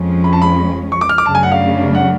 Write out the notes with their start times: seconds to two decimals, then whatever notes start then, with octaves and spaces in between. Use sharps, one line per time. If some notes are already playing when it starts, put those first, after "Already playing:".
Already playing: F2 F3 G#3 C#4
0.24 B5
0.33 A5
0.42 B5
0.92 C#6
1.01 D6
1.09 F6
1.18 D6
1.26 F#2 C#3 F#3 A3 D4 A5
1.35 G#5
1.43 F#5
1.52 F5
1.95 F#5